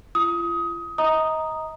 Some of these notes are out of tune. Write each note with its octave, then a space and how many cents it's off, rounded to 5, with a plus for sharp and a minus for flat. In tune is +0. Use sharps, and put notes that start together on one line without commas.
F4 -40 D#6 +20
D#5 +25 A#5 +0 D#6 -5